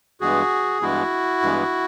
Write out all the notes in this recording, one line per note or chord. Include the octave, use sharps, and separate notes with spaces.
G2 E3 G#3 B3 F#4 G#4
G2 E3 G#3 B3 E4 F#4
G2 E3 G#3 B3